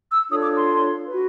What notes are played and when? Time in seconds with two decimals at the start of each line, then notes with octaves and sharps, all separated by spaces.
0.11 E6
0.30 D4 F4 A4 C#5 D#6
0.42 D6
0.55 C6
1.06 F#4 B4